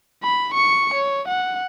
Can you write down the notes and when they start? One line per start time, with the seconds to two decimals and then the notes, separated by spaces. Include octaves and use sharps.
0.23 B5
0.53 C#6 C#7
0.94 C#5
1.28 F#5